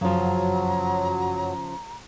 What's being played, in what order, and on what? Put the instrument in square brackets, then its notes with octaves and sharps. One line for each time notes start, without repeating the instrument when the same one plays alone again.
[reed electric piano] F#2 [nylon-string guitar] C#3 F3 [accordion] F#3 [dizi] A#5